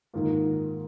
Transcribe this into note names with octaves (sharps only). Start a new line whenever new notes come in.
G#2 D#3 A#3 F4